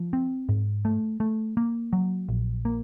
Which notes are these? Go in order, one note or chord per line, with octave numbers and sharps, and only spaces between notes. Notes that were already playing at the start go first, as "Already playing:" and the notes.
Already playing: F3
C4
G#2
A3
A3
A#3
F#3
A#1
A#3